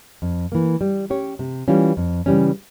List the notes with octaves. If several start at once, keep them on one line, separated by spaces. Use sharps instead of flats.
F2
E3 A#3
G3
C#4 G4 C#5
C3
E3 G3 C#4 F4
F2
C#3 E3 G3 C#4